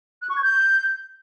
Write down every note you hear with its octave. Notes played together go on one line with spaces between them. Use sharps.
F#6
C#6
G#6
G6